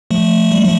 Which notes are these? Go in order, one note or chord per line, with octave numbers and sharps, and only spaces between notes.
F3 A3
G3
F3 A3